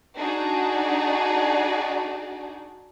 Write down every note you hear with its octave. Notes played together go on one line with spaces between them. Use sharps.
D4 D#4 F#4 G#4 D5